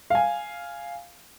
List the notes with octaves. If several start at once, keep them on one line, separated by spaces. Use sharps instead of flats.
F5 G#5